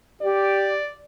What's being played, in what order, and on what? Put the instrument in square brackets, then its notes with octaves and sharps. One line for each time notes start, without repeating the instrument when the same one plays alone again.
[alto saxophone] G4 [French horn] D5